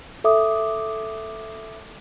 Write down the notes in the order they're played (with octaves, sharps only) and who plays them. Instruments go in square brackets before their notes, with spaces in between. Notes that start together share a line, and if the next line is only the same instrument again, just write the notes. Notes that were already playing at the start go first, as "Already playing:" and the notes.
[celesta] A4 E5 D6 D#6